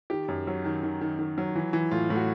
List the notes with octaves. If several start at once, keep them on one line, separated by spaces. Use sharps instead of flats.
D#3 G4
F#2
F#3
D#3
D#3
D#3
D#3
F#3
E3
E3
A2 F4
A2
F#4